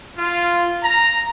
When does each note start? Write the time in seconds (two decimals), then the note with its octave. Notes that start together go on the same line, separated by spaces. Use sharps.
0.17 F4
0.82 A#5